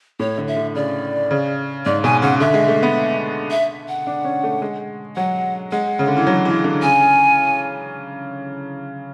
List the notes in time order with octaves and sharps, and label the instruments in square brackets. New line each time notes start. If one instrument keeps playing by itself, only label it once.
[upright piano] A2 [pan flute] C#5
[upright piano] D3
[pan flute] E5
[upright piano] D3
[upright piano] C#3 [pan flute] D5
[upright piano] C#3
[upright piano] G#2 [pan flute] D5
[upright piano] B2 [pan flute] G#5
[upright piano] C#3 [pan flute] F#5
[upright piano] D3 [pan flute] E5
[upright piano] G#3
A3
B3
[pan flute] E5
F#5
[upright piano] D4
C#4
A3
G#3
[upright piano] F#3 [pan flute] F#5
[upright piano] G#3 [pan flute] F#5
[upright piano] C#3
D3
E3
F#3
E3
D3
[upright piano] C#3 [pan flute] G#5